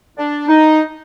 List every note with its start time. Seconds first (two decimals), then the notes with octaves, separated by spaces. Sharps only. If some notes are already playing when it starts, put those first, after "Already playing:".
0.18 D4
0.48 D#4